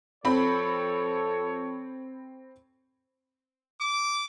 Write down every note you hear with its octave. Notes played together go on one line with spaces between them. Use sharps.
F2 C4 A4 C#5 B5
D6